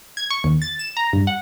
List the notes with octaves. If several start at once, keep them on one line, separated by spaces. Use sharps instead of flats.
G#6
C#6
D#2
A6
E7
A#5
G2
F#5